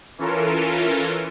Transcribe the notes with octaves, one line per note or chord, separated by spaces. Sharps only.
E3 C#4 F4 A4 A#4